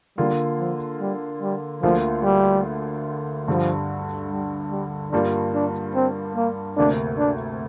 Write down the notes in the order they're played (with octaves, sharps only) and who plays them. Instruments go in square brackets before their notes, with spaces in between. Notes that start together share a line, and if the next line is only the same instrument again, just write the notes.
[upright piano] D3 A#3 F4 [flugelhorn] G3
[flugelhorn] F3
G3
G3
[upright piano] D2 D3 A#3 F4 [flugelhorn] F3
[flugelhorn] G3
[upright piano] G2 D3 G3 [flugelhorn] F3
[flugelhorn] G3
G3
[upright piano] G2 G3 A#3 F4 [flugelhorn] D4
[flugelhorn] D4
C4
A#3
[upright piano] D2 C3 A#3 [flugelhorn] D4
[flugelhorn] D4